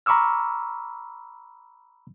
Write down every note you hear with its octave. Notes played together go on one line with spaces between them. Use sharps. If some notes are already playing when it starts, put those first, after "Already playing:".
A#5 B5 C#6 D6 E6 F6